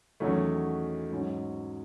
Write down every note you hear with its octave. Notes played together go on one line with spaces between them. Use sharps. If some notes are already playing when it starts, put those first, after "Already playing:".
E2 D#3 F#3 A3 C#4
G#2 F#3 C#4